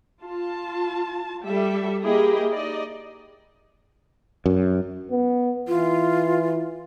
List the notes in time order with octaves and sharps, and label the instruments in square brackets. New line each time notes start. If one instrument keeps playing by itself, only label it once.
[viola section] F4 A5
G3 A4 E5
A#3 E4 G4 G#4 D#5
D#4 D5 D#5
[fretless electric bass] F#2
[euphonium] B3
[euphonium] E3 [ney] F4